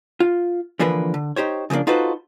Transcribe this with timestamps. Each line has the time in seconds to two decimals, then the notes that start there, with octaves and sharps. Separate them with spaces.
0.20 F4
0.80 D3 E3 F3 A#3 A#4 B4
1.14 D3
1.36 D#4 G4 C5 C#5
1.70 C#3 F3 A3 A#3 D4
1.87 D#4 F4 F#4 A4 B4 C5